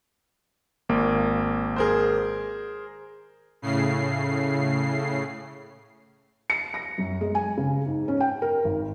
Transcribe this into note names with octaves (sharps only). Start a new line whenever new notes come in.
G#1 A#3
G#4 A#4 C5
A2 C#3 C7
C#7
A#6
F#2
G#3
G#5
C#3
G#2
C#4
G5
A#4
G#1